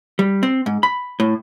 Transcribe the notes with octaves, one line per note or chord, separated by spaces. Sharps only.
G3
C4
G#2
B5
A2